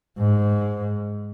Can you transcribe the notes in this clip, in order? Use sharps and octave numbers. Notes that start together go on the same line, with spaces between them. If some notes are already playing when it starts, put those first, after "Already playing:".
G#2